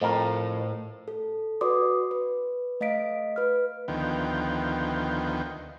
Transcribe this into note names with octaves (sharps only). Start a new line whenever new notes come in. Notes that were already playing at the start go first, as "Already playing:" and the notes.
F2 A2 A#4
A4
F#4 B4 D5 C6 D6 D#6
B4
A3 D#5 F5 B6 D7
B4 F6
D2 D#3 F3 B3 G5